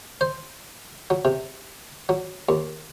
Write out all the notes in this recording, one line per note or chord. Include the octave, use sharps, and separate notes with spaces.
C5
F#3
C3
F#3
D#2